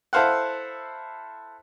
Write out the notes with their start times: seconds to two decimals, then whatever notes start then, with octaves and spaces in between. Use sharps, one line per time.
0.13 E4 A4 C5 F5 F#5